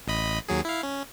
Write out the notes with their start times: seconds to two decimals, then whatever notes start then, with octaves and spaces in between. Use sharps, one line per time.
0.08 A1 D#5 B5
0.48 D#2 F#3 G#4
0.65 E4 F5
0.83 C#4